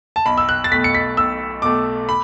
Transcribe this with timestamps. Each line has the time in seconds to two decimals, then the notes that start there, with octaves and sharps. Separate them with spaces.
0.16 A5
0.26 B1 B5
0.38 E6
0.49 F#6
0.64 A6
0.72 B2 A3 B6
0.84 C#7
0.95 B6
1.17 B1 E6
1.62 B2 A3 D6
2.09 B5